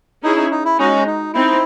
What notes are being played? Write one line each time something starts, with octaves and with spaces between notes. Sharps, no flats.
C#4 D#4 E4 G#4
D#4
D#4
E4
G#3 C#4 D#4 F#4
D#4
C4 D#4 E4